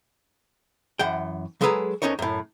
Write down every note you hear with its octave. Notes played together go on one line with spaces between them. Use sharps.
F#2 E3 F#5 G5
F#3 G#3 G#4 A4 B4 A#5
D2 C3 C#4 D#4 A#4 C#5
F#2 A2